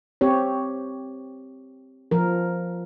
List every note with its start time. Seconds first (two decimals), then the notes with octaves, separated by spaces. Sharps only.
0.21 C4 G4 C#5
2.11 F3 A#4